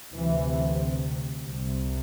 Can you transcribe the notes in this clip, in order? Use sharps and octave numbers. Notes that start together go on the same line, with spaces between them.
D2 C3 E3
C2 C3